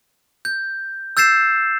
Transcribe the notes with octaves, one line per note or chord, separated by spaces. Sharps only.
G6
E6 G6 A6 C7 E7